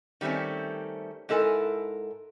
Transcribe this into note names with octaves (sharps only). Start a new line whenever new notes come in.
D#3 G3 A3 C4 C#4
G#2 E4 A4 A#4 G#5